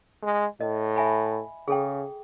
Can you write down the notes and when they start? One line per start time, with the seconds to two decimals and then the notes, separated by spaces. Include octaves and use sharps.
0.23 G#3
0.61 A2 D#5
0.96 E5 G#5 B5
1.68 C#3 G#4 A4 G5